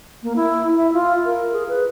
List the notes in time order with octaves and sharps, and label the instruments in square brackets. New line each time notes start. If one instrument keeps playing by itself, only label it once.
[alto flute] A#3
E4
E5
F4
A#4
G#4
B4